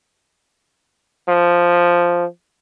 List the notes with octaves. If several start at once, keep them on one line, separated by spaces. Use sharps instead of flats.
F3